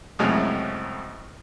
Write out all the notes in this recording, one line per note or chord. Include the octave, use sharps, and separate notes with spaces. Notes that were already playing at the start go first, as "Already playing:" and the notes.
C2 F2 A2 C#3 F#3 G#3